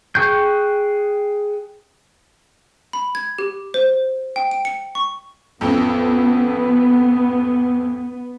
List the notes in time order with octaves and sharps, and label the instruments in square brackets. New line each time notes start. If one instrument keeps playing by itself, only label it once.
[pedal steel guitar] G#4 G5 C#6 F#6 G6
[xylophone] B5
G#6
G4
C5
G5
D7
C#7
C#6
[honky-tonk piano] A1 F2 [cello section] B3